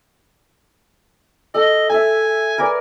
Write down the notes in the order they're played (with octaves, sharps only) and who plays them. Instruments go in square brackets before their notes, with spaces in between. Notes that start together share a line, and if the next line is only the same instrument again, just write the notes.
[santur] A4 [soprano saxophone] D#5
[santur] A4 E5 [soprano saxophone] G#5
[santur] A#4 B4 D5